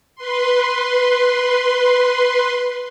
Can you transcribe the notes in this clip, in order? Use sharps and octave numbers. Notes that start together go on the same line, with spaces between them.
B4 C6